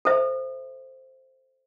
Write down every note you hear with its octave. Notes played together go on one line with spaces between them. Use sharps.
A4 C5 E5